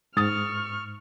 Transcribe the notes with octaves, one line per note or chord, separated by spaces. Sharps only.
G#2 C#6 D#6 F6 A6